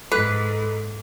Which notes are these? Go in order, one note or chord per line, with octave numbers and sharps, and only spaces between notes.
G#2 A4 B4